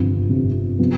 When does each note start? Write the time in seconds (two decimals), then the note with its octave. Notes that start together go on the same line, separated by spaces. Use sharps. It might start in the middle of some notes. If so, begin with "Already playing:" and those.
Already playing: G1 F2 C3 F3
0.28 G1 F2 C3 F3
0.79 C3 F3 B3